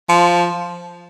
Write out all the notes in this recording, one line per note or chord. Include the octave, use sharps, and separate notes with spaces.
F3